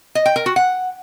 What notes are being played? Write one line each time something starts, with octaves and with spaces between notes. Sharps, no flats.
D#5
G5
A#4
F#4
F#5